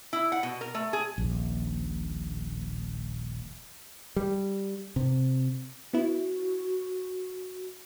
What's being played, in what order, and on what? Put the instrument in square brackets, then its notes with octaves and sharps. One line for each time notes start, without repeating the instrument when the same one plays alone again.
[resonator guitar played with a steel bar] E4
F#5
B2
A#4
A3
G#4
[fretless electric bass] D#1 A#1
[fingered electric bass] G3
C3
[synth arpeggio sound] B3 E4 [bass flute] F#4